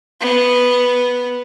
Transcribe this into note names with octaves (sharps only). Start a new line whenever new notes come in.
B3